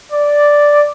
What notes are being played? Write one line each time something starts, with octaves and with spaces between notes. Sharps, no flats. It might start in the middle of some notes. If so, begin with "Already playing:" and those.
D5